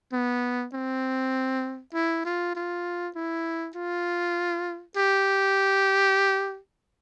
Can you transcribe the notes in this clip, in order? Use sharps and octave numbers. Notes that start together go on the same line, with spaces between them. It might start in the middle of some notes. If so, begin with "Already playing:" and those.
B3
C4
E4
F4
F4
E4
F4
G4